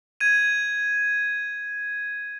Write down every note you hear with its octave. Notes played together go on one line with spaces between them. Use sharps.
G#6 D#7